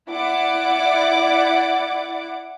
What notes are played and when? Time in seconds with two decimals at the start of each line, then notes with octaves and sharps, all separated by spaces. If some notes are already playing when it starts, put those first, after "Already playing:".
0.10 E4 D5 F#5 D6